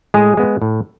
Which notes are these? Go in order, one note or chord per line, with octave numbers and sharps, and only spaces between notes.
A2 G#3 G#4
G#3 B3
A2